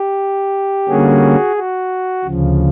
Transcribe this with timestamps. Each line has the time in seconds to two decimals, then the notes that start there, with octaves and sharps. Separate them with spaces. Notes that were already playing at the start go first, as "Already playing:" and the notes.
Already playing: G4
0.89 D3 G3 A#3 C#4 F#4 G#4
1.56 F#4
2.24 D2 C#3 F3